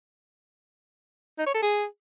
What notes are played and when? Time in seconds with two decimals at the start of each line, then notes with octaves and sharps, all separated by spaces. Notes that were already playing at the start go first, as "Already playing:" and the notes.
1.38 D#4
1.46 C#5
1.54 A4
1.62 G#4